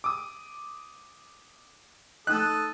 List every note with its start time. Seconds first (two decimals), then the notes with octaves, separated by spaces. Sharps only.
0.04 D6 D#6
2.27 A3 D#4 A4 D#5 D#6 F#6